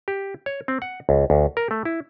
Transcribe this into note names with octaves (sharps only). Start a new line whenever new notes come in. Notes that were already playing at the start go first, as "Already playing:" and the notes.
G4
C#5
C4
F#5
C#2
D2
A#4
A3
E4